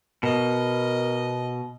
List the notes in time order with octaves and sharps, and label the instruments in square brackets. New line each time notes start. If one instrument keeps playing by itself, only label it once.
[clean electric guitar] B2 [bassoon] A#4 [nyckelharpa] D#5